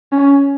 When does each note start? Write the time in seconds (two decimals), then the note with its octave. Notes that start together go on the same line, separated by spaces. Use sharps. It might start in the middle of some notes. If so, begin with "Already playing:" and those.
0.12 C#4